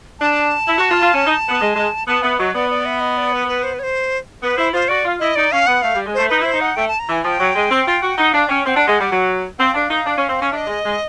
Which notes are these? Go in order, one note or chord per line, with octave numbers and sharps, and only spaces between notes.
D4 A5
E4
F#4
F4
F4
C#4
D#4
B3
G#3
G#3
B3 A5
B3 E5
F#3 D#5
B3 D5
D5
E5
D#5
D5
B4
B4
C5
B4
C#5
C5
B3 B4
E4 C5
F4 C5
F#4 D5
F4
E4 D#5
D#4 D5
C#4 F5
B3 F#5
A3 F5
G3
G#3
A3 C5
D#4 B4
E4 C5
D#4
F#5
A3 G5
A5
A#5
E3 G#5
F3 G5 G#5
F#3
G#3
C4
F4
F#4
D#4 F#5
D4 F5
C#4 G5
C4 G5
F#5
D4
G#3
G3
F#3
C4 F5 F#5
D4
D#4
D4
C#4
C4
C#4
D4 E5
D#5
G#3
G#3